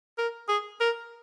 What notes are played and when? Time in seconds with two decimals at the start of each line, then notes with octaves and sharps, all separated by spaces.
0.18 A#4
0.48 G#4
0.80 A#4